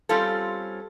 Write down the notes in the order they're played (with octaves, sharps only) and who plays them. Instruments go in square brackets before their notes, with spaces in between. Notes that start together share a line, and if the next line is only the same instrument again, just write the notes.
[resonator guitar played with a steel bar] G3 C4 C#4 F4 A4